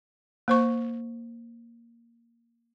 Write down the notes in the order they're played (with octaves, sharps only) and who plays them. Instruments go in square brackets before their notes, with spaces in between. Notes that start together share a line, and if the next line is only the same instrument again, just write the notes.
[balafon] A#3 C5 C#6